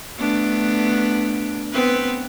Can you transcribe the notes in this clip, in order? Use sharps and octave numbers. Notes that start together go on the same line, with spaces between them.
A3 B3 D4
B3 C4 B4